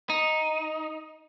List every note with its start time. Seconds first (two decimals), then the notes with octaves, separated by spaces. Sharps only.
0.10 D#4